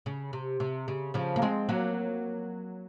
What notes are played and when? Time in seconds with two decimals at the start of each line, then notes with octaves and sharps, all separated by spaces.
0.06 C#3
0.33 C3
0.60 C3
0.88 C#3
1.14 C#3 F3
1.36 A#3
1.42 G#3 C4
1.69 F#3 A#3